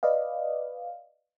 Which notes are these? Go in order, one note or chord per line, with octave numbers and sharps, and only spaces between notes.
B4 D5 D#5 F5